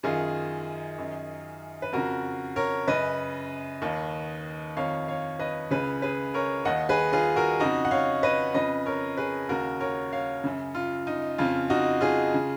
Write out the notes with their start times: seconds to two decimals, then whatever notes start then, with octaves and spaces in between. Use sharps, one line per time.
0.03 F#2 D#3 F4 G#4
0.98 F#2 D#3
1.82 B4
1.93 F2 C#3 F#4 A#4
2.56 A#4 C#5
2.88 F#2 C#3 B4 D#5
3.82 D#2 D#3
4.76 F2 D#3 C#5 F5
5.08 C#5 F5
5.39 B4 D#5
5.71 C#2 C#3 G#4 B4
6.02 G#4 B4
6.34 A#4 C#5
6.65 D#2 D#3 D#5 F#5
6.89 G#4 B4
7.13 F4 G#4
7.36 F#4 A#4
7.60 F2 C#3 D#4 F#4
7.85 F#5
7.91 C#5 F5
8.23 B4 D#5
8.54 F2 C#3 B4 D#5
8.86 A#4 C#5
9.17 G#4 B4
9.49 D#2 C#3 F#4 A#4
9.80 A#4 C#5
10.13 C#5 F5
10.44 F#2 C#3
10.75 F4
11.07 D#4
11.38 F2 C#3 F4
11.70 D#4 F#4
12.01 F4 G#4
12.34 C#3